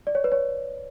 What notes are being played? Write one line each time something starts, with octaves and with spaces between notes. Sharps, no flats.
D5
C#5
B4
C#5